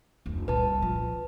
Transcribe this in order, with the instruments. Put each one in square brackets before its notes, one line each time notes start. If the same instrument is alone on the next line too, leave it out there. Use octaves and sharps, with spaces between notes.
[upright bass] F1 D2
[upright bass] C2 A#2 [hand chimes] B4 A5
[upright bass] F3